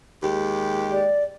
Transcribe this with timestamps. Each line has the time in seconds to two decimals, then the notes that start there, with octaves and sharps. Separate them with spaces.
0.22 D#2 G#3 G4
0.92 D5